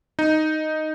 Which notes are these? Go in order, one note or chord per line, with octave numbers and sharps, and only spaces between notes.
D#4